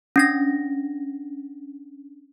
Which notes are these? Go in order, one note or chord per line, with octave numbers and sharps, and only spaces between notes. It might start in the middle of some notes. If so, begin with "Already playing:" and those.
C#4 D4 A#6